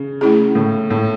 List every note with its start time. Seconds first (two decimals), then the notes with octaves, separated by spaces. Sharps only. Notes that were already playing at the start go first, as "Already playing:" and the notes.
Already playing: C#3
0.21 A3 C#4 E4 G#4
0.55 A2
0.90 A2